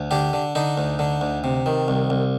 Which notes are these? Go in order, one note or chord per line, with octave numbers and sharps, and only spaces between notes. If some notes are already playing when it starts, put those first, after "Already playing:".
Already playing: D2
D3 G4
D3
D3 D#4
D2
D3
D2
C3
D#3
C2
C2